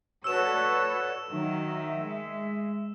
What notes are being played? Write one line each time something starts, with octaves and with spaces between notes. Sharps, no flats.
F#4 A4 B4 C#5 D5 E6 E7
D#3 F#3 D#4 E5
G#3